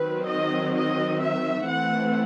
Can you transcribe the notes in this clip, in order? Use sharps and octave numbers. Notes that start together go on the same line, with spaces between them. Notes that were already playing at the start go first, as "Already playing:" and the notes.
Already playing: D#3 F#3 C4 B4
D#5
D#5
E5
E3 A3 C4 F#5